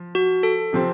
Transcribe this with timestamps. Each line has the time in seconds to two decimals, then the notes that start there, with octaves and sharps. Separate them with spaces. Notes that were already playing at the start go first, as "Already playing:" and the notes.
Already playing: F3
0.15 F#4
0.43 A4
0.73 C3 F3 C4